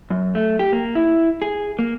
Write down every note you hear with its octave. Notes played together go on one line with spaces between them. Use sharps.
F#2
A3
G4
A#3
E4
G#4
A#3